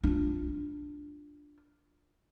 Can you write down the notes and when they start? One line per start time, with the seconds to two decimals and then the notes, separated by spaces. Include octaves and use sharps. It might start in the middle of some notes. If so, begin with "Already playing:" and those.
0.03 D4 F4